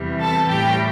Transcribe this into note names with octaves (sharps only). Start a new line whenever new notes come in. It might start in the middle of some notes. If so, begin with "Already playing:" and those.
Already playing: E2 C3 E3 G3
A4 A5
A2 G3 G4 G5